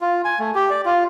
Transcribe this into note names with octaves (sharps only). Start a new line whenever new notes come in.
F4
G#5
A3
G4
D5
F4